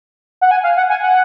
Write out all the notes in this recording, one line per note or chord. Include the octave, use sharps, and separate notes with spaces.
F#5
G#5
F5
F#5
G#5
F#5